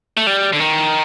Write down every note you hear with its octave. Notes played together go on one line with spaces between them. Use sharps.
A3
G3
D3
D#3